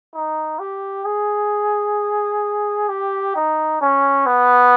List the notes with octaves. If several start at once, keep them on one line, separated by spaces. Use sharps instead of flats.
D#4
G4
G#4
G4
D#4
C#4
B3